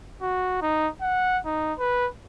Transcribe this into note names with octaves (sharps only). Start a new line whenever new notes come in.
F#4
D#4
F#5
D#4
B4